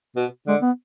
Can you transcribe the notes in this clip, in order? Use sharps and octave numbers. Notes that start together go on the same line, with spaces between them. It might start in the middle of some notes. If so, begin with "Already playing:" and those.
B2
D3 G#3
B3